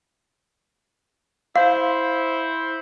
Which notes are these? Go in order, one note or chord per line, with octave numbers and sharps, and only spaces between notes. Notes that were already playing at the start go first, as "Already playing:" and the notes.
E4 C5 F5